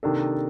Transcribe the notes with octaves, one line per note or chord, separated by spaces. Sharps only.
C3 D#3 A#3 D4 A4